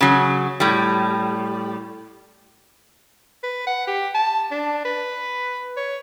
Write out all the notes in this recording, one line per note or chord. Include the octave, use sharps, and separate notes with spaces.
C#3 F#3
A2 G3
B4
F#5
G4
A5
D4
B4
C#5